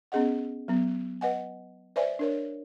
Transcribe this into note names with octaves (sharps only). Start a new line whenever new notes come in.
B3 C#4 G#4 D#5 F#5
F#3 B3
B4 D#5 F#5 G#5
B4 C5 D5 E5 G#5
D4 A#4 C#5